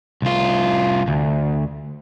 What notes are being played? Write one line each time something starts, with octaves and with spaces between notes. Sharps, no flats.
C2 F4
D2